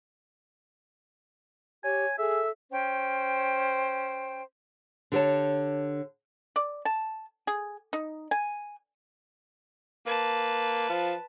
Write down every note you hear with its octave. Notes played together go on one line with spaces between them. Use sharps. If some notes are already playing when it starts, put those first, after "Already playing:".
G4 C#5 G#5
G#4 A4 E5
C#4 C5 G5
D3 G4 A#4 C#5 A5
D5
A5
G#4
D#4
G#5
A#3 B4 A5
F3